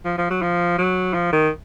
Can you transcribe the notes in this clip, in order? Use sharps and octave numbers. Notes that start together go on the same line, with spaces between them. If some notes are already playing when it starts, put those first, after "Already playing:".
F3
F3
F#3
F3
F#3
F3
D#3